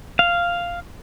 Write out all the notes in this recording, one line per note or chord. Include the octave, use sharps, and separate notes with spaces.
F5